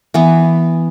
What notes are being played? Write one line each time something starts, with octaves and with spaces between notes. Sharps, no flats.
E3 B3